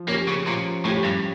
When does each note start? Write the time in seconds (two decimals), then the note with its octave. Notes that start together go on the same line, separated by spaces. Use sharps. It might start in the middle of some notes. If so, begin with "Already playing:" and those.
Already playing: F3
0.09 A#3 C#4 G4 C#5
0.28 C#3
0.47 A#2 F3
0.85 A2 C#4 G4 C#5
1.04 G2